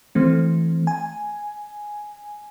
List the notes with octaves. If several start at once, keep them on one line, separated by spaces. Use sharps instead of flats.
E3 A3 C4
G#5